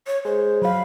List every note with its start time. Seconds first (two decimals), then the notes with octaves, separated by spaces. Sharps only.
0.07 C#5
0.25 G#3 C5
0.62 F#3 F5 B5